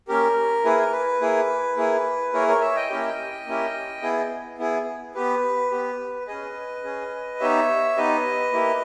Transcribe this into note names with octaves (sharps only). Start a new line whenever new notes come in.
A#3 C#4 G4 A#4
A#3 E4 G#4 B4
A#4
B4
A#3 E4 G#4
A#3 E4 G#4
A#3 E4 G#4 A#4 C#5
A#4 C#5
C#5 E5
D#5 G5
A#3 C#4 E4 G4
A#3 C#4 E4 G4
B3 E4 G#4
B3 E4 G#4
B3 G4 B4
B3 G4
C#4 G#4 B4 D#5
C#4 G#4
B3 D#4 G4 C#5 E5
B3 D#4 G4 B4 D#5
A#3 E4 G4